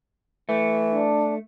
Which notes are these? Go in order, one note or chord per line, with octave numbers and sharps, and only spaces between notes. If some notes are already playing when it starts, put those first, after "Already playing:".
E3 A3
D4